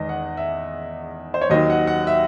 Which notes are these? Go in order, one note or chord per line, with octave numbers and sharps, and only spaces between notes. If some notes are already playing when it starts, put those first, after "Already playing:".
Already playing: E2 D#3 G#3 D#5
F#5
E5
C5
C#5
D#2 D#3 F#3 D#5
F#5
F#5
E5